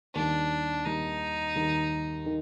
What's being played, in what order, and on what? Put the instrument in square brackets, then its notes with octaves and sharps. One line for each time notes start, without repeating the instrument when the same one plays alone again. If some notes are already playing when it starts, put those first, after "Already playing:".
[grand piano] D#2 D#3 G3 [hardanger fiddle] D4
[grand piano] D#2 D#3 G3 [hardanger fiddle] D#4
[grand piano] D#2 D#3 G3
D#3